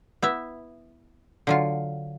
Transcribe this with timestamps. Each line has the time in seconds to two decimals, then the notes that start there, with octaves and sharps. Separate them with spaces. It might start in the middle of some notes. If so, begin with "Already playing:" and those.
0.22 B3 E4 E5
1.47 D3 F#3 F4